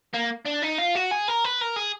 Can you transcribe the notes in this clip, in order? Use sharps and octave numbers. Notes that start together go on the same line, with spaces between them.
A#3
D4
D#4
F4
F#4
G#4
A#4
B4
A#4
G#4